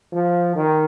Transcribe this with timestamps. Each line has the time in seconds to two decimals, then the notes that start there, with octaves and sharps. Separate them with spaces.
0.12 F3
0.55 D#3